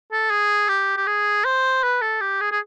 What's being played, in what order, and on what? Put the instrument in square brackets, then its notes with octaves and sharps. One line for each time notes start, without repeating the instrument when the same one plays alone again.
[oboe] A4
G#4
G4
G4
G#4
C5
B4
A4
G4
G#4
G#4